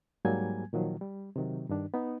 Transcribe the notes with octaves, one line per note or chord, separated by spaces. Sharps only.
G#2 F#3 G3 A#3 G#5 G#6
A#2 D#3 F3 F#3
G3
C3 D#3 F#3
G2 D#3 D4
B3 D#4